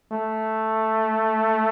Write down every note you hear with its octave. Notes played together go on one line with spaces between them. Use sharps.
A3